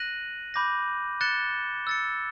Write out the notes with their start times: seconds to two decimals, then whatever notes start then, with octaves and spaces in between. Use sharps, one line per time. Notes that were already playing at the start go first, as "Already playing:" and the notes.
Already playing: F#6 A#6 D#7 F#7
0.54 B5 D6 G6 A#6
1.21 F#6 A6 C#7 E7 G7
1.87 E6 A6 C#7